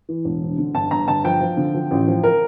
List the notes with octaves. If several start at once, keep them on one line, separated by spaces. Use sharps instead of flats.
E3
E1
D2
D3
G1 A5
G1 A#5
G1 A5
F3 G5
F3
D3
F3
A1
F3
A#4